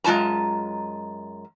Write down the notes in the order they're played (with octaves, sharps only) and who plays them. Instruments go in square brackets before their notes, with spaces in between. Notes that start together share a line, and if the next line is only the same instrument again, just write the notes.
[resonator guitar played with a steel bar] F#2 G#3 F4 A5 A#5